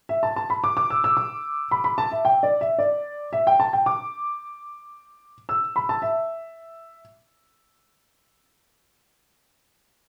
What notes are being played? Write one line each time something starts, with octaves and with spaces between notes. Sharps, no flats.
E5
A5
A5
B5
D6
D6
E6
E6
D6
B5
B5
A5
E5
G5
D5
E5
D5
E5
G5
A5
G5
D6
E6
B5
A5
E5